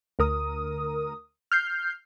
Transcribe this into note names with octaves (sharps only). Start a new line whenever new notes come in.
D2 A#4 D#6
F6 G6 C7